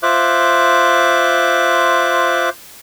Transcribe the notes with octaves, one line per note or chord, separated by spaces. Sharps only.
F4 C5 E5 D6 F#6